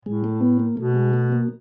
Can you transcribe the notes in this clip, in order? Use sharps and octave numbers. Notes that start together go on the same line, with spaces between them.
A2 G#3
A3
B3
A#3
B2 A3
G#3
A3
A#3